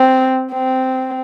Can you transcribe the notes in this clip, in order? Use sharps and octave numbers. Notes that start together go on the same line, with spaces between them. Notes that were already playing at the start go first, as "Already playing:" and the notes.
Already playing: C4
C4